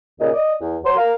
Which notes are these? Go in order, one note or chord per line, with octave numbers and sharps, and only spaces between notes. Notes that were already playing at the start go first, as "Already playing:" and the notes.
D#2 A#2 C#3 D#5
D5 D#5
E2
F#3 C6
A#4 F5